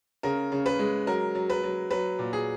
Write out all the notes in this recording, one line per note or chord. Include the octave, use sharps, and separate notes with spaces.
C#3 A#4
C#3
B4
G#3
F#3 A#4
F#3
B4
F#3
F#3 B4
A#2
G#4